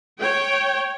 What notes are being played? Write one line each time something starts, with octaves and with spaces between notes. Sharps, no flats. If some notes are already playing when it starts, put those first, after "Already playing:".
C#5 G5